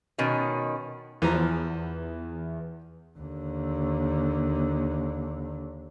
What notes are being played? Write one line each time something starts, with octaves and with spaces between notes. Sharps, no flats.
B2 D#3 C#4
E2 E3 F3 A#5
D#2 D3